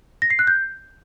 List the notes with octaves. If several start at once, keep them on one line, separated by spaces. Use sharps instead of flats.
A#6
C7
F#6
G6